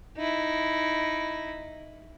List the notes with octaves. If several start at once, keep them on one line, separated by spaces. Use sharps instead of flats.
D#4 E4